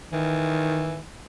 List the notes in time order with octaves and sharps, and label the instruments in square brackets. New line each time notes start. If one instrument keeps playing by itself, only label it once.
[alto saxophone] D#3 [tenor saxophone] E3